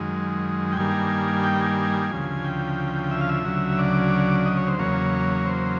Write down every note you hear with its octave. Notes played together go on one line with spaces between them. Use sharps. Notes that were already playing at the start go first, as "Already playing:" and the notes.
Already playing: F#2 D#3 G#3
G5
G2 D#3 G3 A#3 G#5
G5
G#5
D2 C#3 F3
G5
E5
F5
E5
D2 C#3 F#3
D5
D#5
C#5
C5
E2 C#3 F#3 A#3 C#5
C5